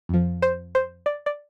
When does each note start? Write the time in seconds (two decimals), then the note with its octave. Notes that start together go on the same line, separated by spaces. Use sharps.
0.09 F2 F3
0.42 C5
0.75 C5
1.06 D5
1.26 D5